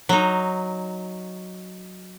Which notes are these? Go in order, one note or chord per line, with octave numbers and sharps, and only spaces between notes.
F#3 D#4